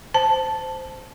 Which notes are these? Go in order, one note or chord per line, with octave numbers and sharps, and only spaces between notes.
C5 A5